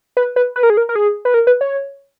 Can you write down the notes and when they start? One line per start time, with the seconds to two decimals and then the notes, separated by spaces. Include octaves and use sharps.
0.17 B4
0.36 B4
0.56 B4
0.63 A#4
0.70 G#4
0.77 A#4
0.89 A#4
0.95 G#4
1.25 B4
1.34 A#4
1.47 B4
1.61 C#5